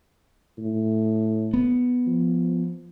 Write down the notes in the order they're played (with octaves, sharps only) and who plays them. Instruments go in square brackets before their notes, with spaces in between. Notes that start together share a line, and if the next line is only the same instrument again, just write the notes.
[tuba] A2
[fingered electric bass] B3
[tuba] F3